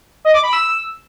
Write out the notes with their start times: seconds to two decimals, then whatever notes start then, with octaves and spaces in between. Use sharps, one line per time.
0.25 D#5
0.34 D6
0.43 B5
0.53 E6